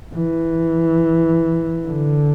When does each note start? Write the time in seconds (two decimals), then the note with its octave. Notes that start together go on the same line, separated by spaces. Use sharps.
0.15 E3
1.87 D3